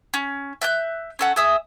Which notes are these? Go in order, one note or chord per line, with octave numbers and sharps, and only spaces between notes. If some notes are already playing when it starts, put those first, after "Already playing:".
C#4
E5 F#6 G6
C#4 A4 F#5
G#4 E5 D#6